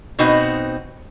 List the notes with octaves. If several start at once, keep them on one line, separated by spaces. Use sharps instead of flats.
B2 B3 C4 D#4 F#4